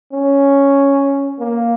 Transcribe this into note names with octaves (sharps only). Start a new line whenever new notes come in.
C#4
A#3